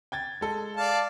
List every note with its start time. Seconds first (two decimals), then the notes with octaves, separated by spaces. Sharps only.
0.12 G5 G#6 A6
0.41 G#3 A4
0.77 D5 F5 A5